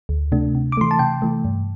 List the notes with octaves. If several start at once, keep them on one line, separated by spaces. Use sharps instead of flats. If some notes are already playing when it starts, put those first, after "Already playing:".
D2
C3 A3 D4
C3
D6
E3 A3 C6
A5
C3 G5
E3 A3
G2